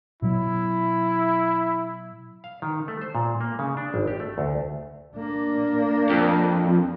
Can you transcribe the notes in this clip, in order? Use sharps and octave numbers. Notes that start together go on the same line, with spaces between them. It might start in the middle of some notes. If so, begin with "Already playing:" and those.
B2 F#3 E4
F5
D#3
A3
C5
A#2
A#3
C#3
D4
G#1
G4
A3
D2
A#3 D4
F2